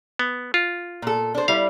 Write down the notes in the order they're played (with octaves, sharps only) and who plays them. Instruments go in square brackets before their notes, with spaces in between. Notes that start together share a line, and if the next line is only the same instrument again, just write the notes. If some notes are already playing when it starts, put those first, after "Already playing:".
[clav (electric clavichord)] B3
F4
[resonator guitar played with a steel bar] A#2 A4
D4 C5
[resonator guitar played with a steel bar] G3 E4 [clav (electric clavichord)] F5